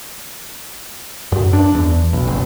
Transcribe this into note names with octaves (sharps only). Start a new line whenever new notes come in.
F#2
D4
E2
B1
F#1